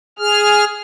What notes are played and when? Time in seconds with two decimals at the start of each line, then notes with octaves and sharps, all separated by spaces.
0.19 G#4 F6